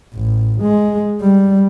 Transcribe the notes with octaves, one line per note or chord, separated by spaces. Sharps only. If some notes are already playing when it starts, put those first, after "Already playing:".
A1
G#3
G3